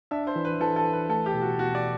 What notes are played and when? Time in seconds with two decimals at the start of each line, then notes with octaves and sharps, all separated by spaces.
0.11 D4 E5
0.27 C5
0.36 E3
0.45 B4
0.60 E3 A4
0.76 A4
0.85 E3
0.93 B4
1.09 A3 A4
1.26 G4
1.34 B2
1.42 F#4
1.59 B2 F#4
1.75 D5